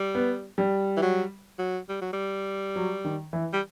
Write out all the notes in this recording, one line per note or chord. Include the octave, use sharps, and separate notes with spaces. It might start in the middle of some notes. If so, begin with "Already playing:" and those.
Already playing: G3
B3
G3
E3
F#3
F#3
G3
F#3
G3
F#3
D#3
E3
G3